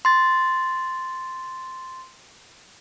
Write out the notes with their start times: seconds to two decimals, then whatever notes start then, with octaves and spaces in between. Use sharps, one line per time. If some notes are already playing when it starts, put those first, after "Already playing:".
0.05 C6 A6